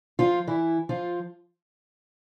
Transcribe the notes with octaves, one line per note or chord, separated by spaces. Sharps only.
F3 F4
E3 E4
F3 F4